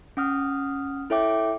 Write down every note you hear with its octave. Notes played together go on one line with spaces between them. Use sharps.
C#4 F#5 D#6 F6
E4 A4 C#5 E5 G5 D6